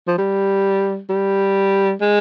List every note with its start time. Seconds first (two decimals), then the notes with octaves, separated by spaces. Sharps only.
0.07 F3
0.18 G3
1.09 G3
2.01 G#3